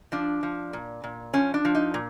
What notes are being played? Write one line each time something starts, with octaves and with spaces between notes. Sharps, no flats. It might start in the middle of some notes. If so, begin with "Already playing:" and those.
F3 D4
F3
A#2
A#2
F3 C#4
D4
F3
D#4
A#2